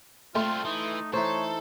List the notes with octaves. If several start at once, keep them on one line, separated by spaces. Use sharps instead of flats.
G3 A3 C4 F4 C6
E3 D#4
E3 D#4 A4 C5 C#5